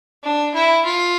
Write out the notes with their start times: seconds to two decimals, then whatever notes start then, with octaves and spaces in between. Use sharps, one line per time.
0.24 D4
0.54 E4
0.85 F4